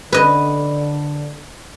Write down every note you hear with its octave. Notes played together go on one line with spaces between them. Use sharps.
D3 B4 D#5